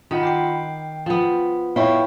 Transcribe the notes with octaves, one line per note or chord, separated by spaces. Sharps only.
D#3 F4 F#5 B5
G5 D6 C7
F3 B3
E4 C#5 F5 G5